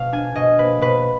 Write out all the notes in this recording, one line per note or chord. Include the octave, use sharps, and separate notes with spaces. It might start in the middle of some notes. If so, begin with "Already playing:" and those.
Already playing: B2 F5
D4 G#5
B2 D#5
A#3 B4
B2 B4